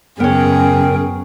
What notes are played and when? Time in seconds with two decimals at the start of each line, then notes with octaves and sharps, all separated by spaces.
0.20 F#2 C#3 B3 C#4 G#4 A#4 G5